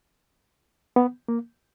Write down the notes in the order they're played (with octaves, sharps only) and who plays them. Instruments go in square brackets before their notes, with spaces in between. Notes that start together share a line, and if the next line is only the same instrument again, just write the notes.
[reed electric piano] B3
A#3